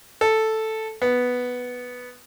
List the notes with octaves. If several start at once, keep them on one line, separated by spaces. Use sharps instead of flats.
A4
B3